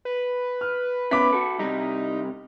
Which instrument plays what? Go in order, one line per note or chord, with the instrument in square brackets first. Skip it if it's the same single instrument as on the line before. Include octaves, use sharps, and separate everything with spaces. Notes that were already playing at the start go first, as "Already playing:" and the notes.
[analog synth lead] B4
[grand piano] F6
[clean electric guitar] B3 C#4 E4 [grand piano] B5 D6 B6
[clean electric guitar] F#4 A4
[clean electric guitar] C3 G3 [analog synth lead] D#4